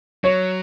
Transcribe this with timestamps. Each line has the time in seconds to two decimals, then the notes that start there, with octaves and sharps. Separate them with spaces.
0.24 F#3 C#5